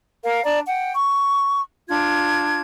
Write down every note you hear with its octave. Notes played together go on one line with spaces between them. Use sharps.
A#4 F5
D4 D5 A5 A#5
F#5 G5
C#6
D4 F4 G#6